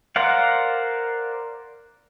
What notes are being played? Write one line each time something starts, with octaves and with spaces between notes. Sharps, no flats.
A#4 C5 D5 F5 F#5